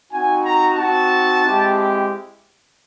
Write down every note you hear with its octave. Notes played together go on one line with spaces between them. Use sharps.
C4 D#4 F#4 G#5
A#5
C4 D#4 F#4 A5
G#3 C4 E4 G4